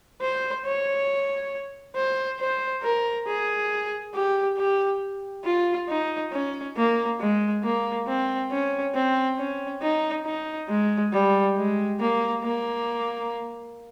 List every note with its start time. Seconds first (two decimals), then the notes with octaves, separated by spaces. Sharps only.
0.21 C5
0.65 C#5
1.96 C5
2.39 C5
2.83 A#4
3.27 G#4
4.14 G4
4.57 G4
5.44 F4
5.88 D#4
6.32 C#4
6.76 A#3
7.20 G#3
7.63 A#3
8.07 C4
8.51 C#4
8.94 C4
9.38 C#4
9.81 D#4
10.25 D#4
10.69 G#3
11.12 G3
11.56 G#3
12.00 A#3
12.43 A#3